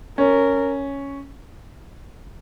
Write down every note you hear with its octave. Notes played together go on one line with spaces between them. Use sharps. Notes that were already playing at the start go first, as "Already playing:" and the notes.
C#4 A#4